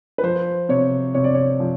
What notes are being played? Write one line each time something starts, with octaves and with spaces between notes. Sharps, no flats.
B4
F3 C5
C3 C#5
C3 C#5
D5
C#5
F3